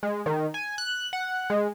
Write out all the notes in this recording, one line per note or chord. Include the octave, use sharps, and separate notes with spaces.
G#3
D#3
G#5
F#6
F#5
G#3